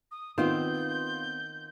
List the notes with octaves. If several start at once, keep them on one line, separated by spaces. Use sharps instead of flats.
D#6
D#3 B3 C4 F4 C5 G6